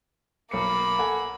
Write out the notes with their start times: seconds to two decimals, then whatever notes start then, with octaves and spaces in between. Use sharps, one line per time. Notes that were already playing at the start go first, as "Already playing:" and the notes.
0.51 B1 A#3 B5 C#7
0.99 A4 F#5 G#5